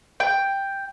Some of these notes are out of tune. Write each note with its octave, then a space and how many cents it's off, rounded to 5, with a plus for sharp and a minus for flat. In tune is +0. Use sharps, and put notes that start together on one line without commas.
G5 +5